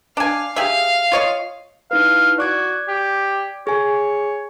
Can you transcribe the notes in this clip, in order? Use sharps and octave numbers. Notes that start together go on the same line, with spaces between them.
D4 F5 G#5
G4 G#4 E5 F5
F4 C#5 D#5
D#4 E4 B4 F5
F#4 D5 D6 G#6
G4
G#4 C#5 G#5